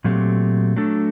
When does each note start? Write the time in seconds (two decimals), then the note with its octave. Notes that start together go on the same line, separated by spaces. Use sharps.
0.04 A#2 F#3 A3 C4 G4
0.77 F#3 A3 D4 A4